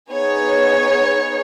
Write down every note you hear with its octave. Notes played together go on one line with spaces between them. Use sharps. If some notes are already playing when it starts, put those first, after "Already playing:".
B3 D#4 G#4 C#5